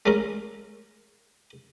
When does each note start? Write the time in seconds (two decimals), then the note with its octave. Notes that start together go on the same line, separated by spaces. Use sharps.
0.06 G#3 A3 C#4 A#4